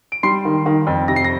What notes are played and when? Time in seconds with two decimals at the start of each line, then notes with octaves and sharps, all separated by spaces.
0.12 D7
0.23 G3 C6 C7
0.45 D#3
0.66 D#3
0.87 F2
1.08 C3 A#6
1.16 C7
1.24 A#6